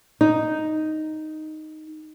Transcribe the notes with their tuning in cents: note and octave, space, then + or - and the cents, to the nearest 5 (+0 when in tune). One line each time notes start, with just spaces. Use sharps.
D#4 +0